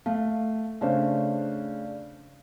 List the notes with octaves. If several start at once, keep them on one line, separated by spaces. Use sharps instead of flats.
A3 F5
C#3 A3 C#4 D4 C5